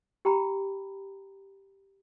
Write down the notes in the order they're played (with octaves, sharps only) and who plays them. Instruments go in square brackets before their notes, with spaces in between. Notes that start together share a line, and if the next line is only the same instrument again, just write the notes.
[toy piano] G4 G5 A#5 B5